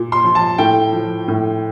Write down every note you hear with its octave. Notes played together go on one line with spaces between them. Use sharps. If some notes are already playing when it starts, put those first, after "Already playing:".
Already playing: A#2
C6
F3
A5
A2 G5
F3
A2